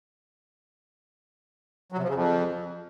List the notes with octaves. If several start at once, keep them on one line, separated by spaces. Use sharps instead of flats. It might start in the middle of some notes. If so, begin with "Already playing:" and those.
F#3
C3
F3
C#3
F2